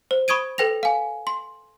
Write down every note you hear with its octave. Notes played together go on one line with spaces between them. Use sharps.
C5
B5 C#6 D#6 G#6 D7 D#7
A4 B4 G5 A#6 F7
F5 G#5
C6